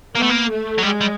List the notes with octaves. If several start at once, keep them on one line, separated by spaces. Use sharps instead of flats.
A#3 B3
A3
A#3
A3
F#3
G3 G#3
G3